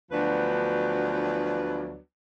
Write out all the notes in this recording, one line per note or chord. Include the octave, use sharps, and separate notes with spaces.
D2 F3 F#3 B3 D4 B4